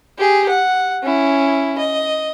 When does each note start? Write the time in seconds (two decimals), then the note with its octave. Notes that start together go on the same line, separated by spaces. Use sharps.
0.18 G4 G#4
0.49 F#5
1.03 C#4 E4
1.78 D#5